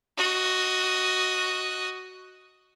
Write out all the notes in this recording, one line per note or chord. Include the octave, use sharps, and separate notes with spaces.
F#4 D#5